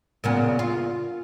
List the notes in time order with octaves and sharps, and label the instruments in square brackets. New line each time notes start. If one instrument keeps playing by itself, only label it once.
[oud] A#2 C#3 B3
F4